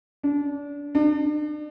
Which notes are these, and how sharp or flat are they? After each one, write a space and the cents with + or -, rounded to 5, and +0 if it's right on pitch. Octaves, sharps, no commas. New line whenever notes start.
D4 -25
D4 +40